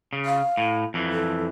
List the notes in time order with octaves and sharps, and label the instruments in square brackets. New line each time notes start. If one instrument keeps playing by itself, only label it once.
[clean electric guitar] C#3
[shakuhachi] F5
[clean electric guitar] A2
F2 E3
[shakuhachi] A4